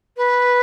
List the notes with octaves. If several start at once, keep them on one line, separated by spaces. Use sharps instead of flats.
B4